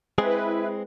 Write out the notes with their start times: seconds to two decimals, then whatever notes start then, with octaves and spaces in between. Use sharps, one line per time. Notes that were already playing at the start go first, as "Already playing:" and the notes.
0.18 G#3 C4 E4 G#4 B4